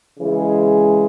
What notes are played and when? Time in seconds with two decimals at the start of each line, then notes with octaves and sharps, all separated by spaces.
0.18 C#3 E3 G#3